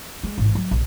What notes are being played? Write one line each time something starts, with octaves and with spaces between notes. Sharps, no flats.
G#3
A1 G#2
F#3
A#1